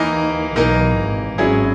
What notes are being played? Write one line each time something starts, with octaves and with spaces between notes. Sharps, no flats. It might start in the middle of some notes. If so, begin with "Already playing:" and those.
Already playing: D#2 D#3 E3 A#3 D#4 A#4
B1 B2 E3 A#3 D#4 A#4
G#1 G#2
G#1 G#2 F#3 C#4 E4 G#4